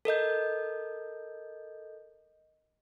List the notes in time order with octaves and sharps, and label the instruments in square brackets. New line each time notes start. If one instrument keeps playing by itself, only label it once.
[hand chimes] A4 A#4 D#5 G6